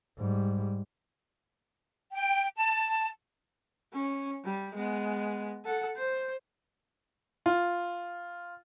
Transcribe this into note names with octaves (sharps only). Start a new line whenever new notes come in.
G#2 G3
G5
A5
C#4
G3
G#3 B3
A4 F#5
C5
F4